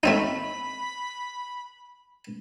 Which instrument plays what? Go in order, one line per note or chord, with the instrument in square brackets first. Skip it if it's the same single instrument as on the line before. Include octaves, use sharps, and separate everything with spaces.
[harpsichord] A3 C4 D#4 [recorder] B5